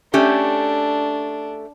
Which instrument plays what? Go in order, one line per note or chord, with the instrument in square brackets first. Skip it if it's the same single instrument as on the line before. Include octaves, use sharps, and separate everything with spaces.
[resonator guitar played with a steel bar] A3 C#4 G4 [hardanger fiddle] D4